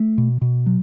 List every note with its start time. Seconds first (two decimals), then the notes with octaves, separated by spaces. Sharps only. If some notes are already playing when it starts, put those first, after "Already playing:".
Already playing: A3
0.18 B2
0.41 B2
0.66 F#3